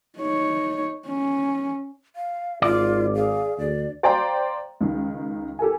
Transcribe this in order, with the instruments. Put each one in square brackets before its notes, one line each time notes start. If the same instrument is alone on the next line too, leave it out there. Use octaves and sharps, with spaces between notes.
[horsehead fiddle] D#4 C#5
C#4
[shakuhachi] F5
[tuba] G#1 [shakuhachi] F4 [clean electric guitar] D5
[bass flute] G#4 [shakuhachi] F5
[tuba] D2 [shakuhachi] D5
[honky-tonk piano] C5 D5 F5 G5 A#5 C6
C#2 D#3
G4 A4 A#4 G#5